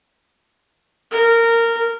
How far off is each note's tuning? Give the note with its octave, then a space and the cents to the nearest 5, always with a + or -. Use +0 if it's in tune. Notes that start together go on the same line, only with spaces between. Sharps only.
A#4 -15